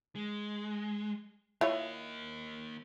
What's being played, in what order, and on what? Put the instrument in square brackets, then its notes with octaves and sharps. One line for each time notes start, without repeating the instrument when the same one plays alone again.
[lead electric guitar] G#3
[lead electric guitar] A#3 D#5 [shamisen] E4 F4 C#5